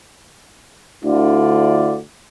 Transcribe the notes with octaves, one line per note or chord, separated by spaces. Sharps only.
D2 D3 E4 F4 D5